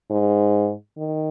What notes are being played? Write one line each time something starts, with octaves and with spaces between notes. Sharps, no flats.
G#2
D#3